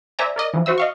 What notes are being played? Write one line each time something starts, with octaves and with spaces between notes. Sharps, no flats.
C5 D5 E5 G#5 A#5
A#4 D5 D#5
E3 F3
F#4 C5 E5 E6
D#5 F5 C#6